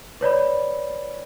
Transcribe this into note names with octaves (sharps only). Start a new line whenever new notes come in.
B4 C#5 D5 B5